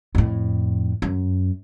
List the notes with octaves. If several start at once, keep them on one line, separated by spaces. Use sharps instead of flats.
F2 A2
F#2